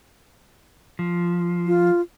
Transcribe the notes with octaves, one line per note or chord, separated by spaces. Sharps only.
F3
F4